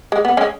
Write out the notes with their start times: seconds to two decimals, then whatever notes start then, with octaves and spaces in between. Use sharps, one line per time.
0.12 G#3
0.25 B3
0.37 G#3 C#4